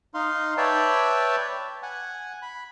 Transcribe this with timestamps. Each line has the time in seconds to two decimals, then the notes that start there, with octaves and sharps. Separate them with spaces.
0.14 D#4 F5 C6
0.57 B4 C#5 D5 E5 G5 A5
1.83 F#5 G#5
2.42 B5